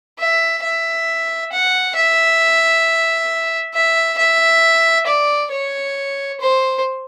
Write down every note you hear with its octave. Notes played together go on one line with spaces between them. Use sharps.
E5
E5
F#5
E5
E5
E5
D5
C#5
C5